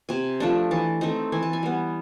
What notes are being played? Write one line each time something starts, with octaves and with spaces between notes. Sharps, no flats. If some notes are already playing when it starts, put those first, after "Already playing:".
C3 G#5
F3 A3 D4
E3 A5
A3 C4 D#4
E3 G#5
A5
G#5
G3 B3